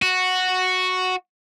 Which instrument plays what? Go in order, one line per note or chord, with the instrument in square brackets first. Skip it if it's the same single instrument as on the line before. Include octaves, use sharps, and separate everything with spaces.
[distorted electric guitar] F#4